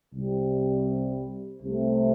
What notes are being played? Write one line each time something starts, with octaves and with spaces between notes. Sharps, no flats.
C2 C3 G3
C2 C3 A3